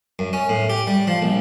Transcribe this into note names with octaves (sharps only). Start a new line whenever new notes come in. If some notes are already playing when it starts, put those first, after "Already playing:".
F#2
C#4
A2
G4
G3
F3
A#1